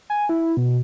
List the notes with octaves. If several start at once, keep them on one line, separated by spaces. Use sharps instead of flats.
G#5
E4
B2